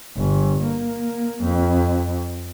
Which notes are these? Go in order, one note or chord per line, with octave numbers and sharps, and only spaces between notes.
G1
A#3
F2